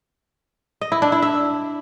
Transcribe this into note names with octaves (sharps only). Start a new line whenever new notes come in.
D#5
E4
D4
E4
E5